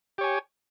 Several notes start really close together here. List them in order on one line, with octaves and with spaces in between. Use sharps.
G4 C#5 G#5